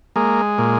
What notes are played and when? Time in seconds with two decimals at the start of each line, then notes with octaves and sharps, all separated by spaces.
0.16 G#3 A#3
0.58 A#2